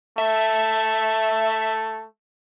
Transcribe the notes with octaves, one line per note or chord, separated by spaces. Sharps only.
A3 E5